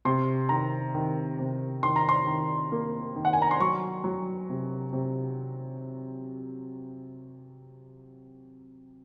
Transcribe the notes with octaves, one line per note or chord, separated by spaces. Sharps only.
C3 C6
D#3 A#5
D#3
C3
D#3 C6
A#5
C6
D#3
A#3
D#3
F#5
G#5
A#5
C6
F#3 C#6
F#3
C3
C3